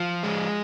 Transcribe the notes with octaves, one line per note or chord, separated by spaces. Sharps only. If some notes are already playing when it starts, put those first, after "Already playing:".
Already playing: F3
G#3